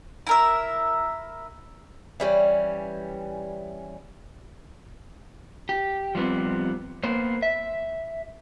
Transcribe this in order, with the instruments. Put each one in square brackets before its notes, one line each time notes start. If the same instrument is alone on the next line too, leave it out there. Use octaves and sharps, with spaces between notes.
[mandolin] E4 A#4 E5
[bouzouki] E3 G3 C#4
[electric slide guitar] G4
F3 G3 B3 C4
A#3 B3 C5
E5